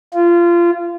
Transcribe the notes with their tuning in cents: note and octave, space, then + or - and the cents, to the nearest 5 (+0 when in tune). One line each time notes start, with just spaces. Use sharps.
F4 -25